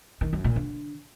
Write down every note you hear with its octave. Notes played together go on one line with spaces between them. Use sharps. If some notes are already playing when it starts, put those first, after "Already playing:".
D#3
F#2
A#2
D3